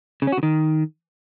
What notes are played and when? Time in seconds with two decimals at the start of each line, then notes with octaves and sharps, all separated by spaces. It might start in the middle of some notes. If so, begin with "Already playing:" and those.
0.22 C#3
0.27 C#4
0.32 F#4
0.38 C#3
0.43 D#3